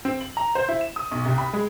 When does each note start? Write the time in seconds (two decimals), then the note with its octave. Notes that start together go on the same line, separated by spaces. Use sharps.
0.05 C4
0.21 F#7
0.37 A#5
0.55 C5
0.69 E4
0.81 E7
0.96 D#6
1.11 B1
1.25 C2
1.38 B5
1.53 G#3